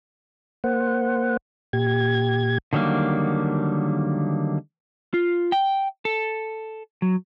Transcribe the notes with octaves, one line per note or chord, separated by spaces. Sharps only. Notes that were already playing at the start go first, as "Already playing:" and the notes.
A#3 C5 F#5
A#2 G4 G#6
D3 D#3 F#3 G3 A#3
F4
G5
A4
F#3